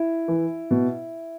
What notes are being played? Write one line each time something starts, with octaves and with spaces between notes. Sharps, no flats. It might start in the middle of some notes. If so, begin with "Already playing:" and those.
Already playing: E4
E3
B2